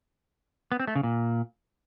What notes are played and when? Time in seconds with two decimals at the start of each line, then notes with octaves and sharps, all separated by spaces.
0.72 B3
0.80 C4
0.87 A3
0.95 C#3
1.03 A#2